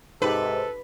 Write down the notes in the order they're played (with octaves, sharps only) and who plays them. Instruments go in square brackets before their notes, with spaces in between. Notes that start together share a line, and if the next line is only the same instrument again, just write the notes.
[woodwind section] G#2 C3 [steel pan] D#4 G4 [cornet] A4 [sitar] B4